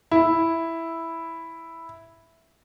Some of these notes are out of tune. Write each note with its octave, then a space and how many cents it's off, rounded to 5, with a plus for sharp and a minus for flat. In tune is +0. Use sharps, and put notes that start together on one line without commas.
E4 +0